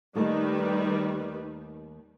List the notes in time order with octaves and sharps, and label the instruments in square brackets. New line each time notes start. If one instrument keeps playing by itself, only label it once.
[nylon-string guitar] D#2 A3 [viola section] D#3 G3 B4